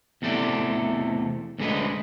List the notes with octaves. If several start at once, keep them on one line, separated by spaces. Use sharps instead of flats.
E2 C3 A3 A4 D5
D2 D3 G#3 B4 D#5